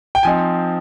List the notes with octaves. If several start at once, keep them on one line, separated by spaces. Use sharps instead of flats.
G5
F3 C4 D#4 G#5